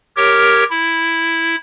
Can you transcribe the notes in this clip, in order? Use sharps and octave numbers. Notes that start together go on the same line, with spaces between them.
G4 A#4 C#5
E4